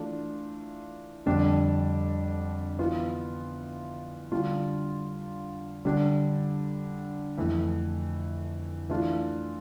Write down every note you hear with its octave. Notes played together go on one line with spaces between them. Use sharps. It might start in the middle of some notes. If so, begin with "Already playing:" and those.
Already playing: E3 A3 D4 F4
F2 D3 G3 D4
E3 B3 F4
D3 G3 D4 F4
D3 G3 D4
F2 E3 A3
E3 A3 D4 F4